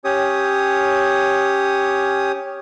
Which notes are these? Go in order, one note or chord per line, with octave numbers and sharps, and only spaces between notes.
C#4 G4 C#5 D#6